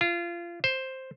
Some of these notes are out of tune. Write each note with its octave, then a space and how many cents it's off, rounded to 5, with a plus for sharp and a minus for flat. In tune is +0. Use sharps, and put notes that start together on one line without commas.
F4 -25
C5 +5